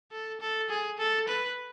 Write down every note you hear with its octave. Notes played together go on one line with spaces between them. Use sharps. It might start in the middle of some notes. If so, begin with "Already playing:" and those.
A4
A4
G#4
A4
B4